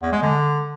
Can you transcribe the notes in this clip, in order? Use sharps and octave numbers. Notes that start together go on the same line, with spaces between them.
E2
G#3
D3